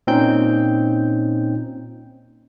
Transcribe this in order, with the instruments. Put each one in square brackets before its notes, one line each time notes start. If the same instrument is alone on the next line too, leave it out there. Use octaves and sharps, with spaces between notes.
[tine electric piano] A#2 C4 C#4 D#4 G5 G6